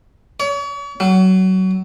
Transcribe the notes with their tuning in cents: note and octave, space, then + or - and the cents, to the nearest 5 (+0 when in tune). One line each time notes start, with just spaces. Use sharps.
C#5 +40
F#3 +20